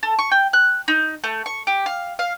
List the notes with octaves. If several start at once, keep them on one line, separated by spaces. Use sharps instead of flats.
A4
C#6
G5
F#6
D#4
A3
C#6
G4
F5
F5